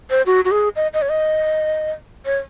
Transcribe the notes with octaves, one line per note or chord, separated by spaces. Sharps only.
C5
F#4
F#4
G#4
D#5
D#5
C#5
D#5
C#5